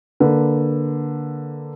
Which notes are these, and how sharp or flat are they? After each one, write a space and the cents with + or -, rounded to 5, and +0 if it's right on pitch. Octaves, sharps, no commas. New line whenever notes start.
D3 +0 A#3 +0 B4 -10